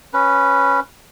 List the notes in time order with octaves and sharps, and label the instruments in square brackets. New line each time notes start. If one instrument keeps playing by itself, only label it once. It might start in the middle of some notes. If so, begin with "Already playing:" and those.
[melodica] C#4 B4